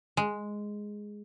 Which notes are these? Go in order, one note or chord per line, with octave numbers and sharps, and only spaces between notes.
G#3